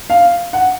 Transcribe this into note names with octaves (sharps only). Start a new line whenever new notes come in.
F5
F#5